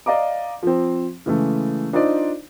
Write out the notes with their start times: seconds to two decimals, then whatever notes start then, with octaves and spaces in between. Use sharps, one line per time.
0.06 D5 D#5 F5 A#5 D6
0.63 F3 C4
1.26 C#3 E3 G#3 A3
1.93 D4 D#4 F4 C5 D5 D#5